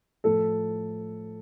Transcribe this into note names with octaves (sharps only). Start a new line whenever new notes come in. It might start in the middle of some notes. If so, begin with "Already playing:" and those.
A2 F3 A4